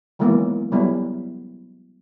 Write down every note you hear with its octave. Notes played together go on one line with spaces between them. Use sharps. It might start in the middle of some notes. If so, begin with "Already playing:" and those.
D#3 E3 F#3 G#3 A#3 B3
F#3 G3 B3 E4